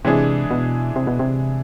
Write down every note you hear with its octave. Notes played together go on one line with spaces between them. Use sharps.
C3 E3 G#3 D4 G#4
B2
C3
B2
C3